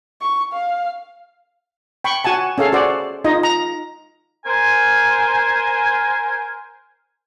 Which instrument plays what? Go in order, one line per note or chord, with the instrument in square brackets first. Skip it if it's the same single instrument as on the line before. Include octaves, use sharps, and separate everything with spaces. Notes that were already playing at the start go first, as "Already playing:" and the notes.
[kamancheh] C#6
F5
[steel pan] G5 B5 C#6
F#4 F#5 G#5 A5
C#4 G#4 A4 F5
F#4 C5 D5
D#4 F4 D#5
A#5
[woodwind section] A#4 C5 G#5